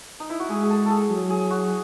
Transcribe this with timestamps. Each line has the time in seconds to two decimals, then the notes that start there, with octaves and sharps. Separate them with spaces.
0.20 D#4
0.30 E4
0.39 F#4
0.50 G#3 G#4
0.63 G#4
0.70 A4
0.85 G#4 A4
1.10 F#3
1.30 G#4
1.50 F#4